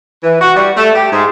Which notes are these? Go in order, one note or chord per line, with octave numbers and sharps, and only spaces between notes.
E3
F#4
G3
A3
G4
G#2